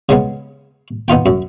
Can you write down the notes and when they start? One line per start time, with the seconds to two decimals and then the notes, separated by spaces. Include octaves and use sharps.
0.09 C#3 G#3 B3
1.08 B3 D#4 F4 G5
1.26 F#2